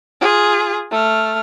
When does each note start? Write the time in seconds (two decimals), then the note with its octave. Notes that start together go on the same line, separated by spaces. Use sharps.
0.21 F4 G#4
0.92 A3 F6